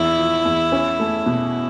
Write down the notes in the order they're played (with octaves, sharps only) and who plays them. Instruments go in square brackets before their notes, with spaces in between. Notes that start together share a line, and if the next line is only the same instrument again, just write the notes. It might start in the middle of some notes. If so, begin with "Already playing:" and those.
Already playing: [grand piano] E2 [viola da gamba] E4
[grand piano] F3
E2
C#4
A3
B2